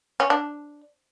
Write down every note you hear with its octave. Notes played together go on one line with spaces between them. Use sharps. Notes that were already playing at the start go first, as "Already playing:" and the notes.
C#4
D4